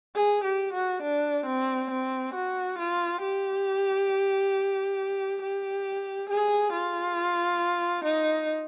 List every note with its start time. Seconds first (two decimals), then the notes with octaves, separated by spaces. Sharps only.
0.16 G#4
0.44 G4
0.74 F#4
1.03 D4
1.47 C4
1.91 C4
2.35 F#4
2.79 F4
3.22 G4
5.42 G4
6.30 G#4
6.73 F4
8.05 D#4